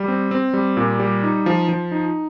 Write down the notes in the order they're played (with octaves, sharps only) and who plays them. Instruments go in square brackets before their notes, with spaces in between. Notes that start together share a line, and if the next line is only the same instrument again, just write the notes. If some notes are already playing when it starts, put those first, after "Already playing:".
Already playing: [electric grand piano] G3
C4
C4
G3
A#2
G3
D#4
F3
F3
D#4